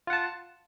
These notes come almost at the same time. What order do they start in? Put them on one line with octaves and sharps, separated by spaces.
F4 F#5 A5